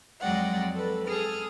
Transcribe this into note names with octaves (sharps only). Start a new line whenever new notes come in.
F2 F#3 G#3 D5 F#5 G5
A4 B4
G#4 A4 D#6 F6